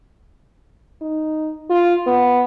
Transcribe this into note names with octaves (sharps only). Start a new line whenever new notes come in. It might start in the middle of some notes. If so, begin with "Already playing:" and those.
D#4
F4
B3